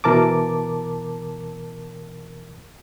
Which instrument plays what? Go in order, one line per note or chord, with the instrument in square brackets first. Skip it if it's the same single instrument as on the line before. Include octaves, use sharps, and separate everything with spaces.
[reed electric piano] B2 E3 A#4 A5 D6